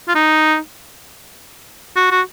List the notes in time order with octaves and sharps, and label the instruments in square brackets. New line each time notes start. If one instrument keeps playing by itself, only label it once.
[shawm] F4
D#4
F#4
F#4